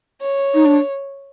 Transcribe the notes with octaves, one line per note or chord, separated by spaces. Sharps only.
C#5
D#4
D4